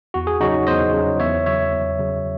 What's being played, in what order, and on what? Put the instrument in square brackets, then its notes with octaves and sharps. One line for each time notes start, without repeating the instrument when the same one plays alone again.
[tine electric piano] E2 F#4
G#4
C#3 F#3 D#4 F#4
E2 C5 D#5
C#3 F#3
E2 C#5 E5
C#3 F#3 C#5 E5
E2
C#3 F#3